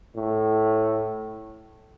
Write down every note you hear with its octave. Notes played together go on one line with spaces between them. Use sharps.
A2